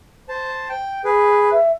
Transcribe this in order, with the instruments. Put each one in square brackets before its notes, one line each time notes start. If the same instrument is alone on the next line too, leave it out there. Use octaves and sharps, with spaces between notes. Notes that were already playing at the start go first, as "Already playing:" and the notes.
[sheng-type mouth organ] C5 A5
G5
G#4 B4
[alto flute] E5